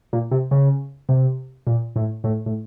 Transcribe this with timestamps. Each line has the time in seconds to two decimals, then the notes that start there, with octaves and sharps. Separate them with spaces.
0.13 A#2
0.31 C3
0.51 C#3
1.09 C3
1.67 A#2
1.96 A2
2.24 A2
2.46 A2